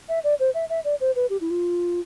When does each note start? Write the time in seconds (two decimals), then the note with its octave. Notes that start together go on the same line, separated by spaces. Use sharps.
0.09 E5
0.24 D5
0.39 C5
0.54 E5
0.69 E5
0.84 D5
1.00 C5
1.15 B4
1.30 G4
1.41 E4
1.50 F4